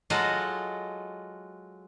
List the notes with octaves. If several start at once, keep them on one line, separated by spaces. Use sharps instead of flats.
F#3 G#3 F4 F#4 A4 D#5